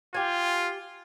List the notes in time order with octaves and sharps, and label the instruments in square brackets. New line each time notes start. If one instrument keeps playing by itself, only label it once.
[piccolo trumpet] F4 [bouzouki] G4 G#5